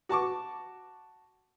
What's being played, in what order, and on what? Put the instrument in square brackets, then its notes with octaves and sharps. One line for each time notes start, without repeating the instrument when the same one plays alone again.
[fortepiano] F#4 A5 C#6 D6